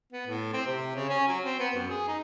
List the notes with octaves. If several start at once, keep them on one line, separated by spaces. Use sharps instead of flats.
B3
A2
C4
C3
C#3
C#4
F#3
C4
B3
F#2
G#4
D#4